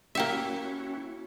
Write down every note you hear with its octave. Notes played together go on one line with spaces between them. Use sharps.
A#3 C#4 E4 F#4 G4 E5